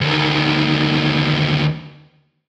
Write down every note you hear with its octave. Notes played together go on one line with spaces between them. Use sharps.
D2 D#3